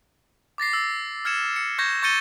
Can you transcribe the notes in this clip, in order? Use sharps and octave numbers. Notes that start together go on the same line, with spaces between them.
D6 A6 A#6 C7
E6
F6 G#6 C#7 E7
C#7
C#6 G6 G#6 A#6
C#6 G6 A6 C#7 D#7 G7